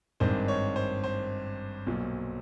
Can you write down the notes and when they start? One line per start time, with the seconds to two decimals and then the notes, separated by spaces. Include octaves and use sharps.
0.20 G#1 G2 D#3 G#3 C5
0.48 C#5
0.76 C5
1.04 C5
1.86 B1 A#2 F#3